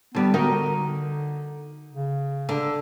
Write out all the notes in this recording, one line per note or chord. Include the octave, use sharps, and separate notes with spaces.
D3 G3 B3
D3 D#4 F#4 A#4
C#3
D3